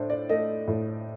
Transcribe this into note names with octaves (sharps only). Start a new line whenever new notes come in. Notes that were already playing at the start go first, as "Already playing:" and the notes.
Already playing: A2 D4 C5
D5
A3 D#5
A2